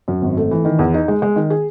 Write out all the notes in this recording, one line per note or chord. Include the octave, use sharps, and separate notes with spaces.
F#2
G#1
A3
E3
D#3
E2
D#4
G#3
G#3
D#3
G#4